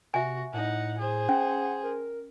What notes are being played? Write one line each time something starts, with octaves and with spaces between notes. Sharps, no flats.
C3 F#4 E5 G#5
A2 D#4 F#5
G#4 C5
C#4 F#5
A#4